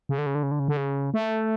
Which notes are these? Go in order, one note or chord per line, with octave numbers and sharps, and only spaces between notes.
C#3
D3
C#3
D3
C#3
D3
C#3
D3
C#3
A3